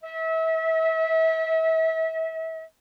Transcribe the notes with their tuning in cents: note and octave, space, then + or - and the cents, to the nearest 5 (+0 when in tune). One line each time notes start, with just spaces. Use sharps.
E5 -35